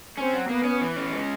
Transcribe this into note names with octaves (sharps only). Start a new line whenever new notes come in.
C4 C#4
F#3
A#3 B3
C#4
E3
C#4
G#3